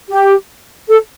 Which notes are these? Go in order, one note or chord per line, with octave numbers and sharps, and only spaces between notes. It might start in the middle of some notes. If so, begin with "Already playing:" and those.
G4
A4